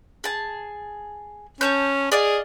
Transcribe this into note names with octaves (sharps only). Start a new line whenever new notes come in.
G#4 A5
C#4 C#5 A5 G6
G#4 D5 D#5 F5